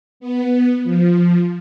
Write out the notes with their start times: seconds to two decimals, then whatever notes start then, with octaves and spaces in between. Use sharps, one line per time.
0.20 B3
0.84 F3